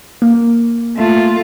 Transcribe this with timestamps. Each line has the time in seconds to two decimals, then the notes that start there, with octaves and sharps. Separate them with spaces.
0.22 A#3
0.96 A3 F4